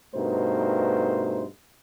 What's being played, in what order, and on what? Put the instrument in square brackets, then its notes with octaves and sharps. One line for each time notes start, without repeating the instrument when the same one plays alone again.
[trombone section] G2 B2 A3 D#4 A#4 C5